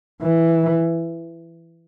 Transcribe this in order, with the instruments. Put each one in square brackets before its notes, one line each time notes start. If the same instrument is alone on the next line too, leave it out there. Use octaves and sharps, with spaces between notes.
[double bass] E3